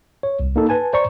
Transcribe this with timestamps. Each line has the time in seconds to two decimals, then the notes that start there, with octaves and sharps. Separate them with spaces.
0.23 C#5
0.40 C2
0.56 A#3 D#4 A4
0.69 B4 G#5 A5
0.93 C5 D5 A#5 C#6